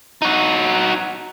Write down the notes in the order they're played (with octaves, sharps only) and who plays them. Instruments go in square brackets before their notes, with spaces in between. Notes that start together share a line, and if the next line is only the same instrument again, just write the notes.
[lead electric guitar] D#4 F#4